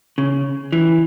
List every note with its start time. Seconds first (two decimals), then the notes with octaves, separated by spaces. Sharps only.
0.18 C#3
0.73 E3